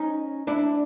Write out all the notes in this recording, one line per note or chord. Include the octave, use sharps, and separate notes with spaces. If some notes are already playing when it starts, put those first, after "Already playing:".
Already playing: C#4 D#4
D4 E4